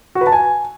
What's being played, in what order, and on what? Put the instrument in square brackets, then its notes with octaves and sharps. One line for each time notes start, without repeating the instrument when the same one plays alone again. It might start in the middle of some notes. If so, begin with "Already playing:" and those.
[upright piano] F#4
B4
A5
G#5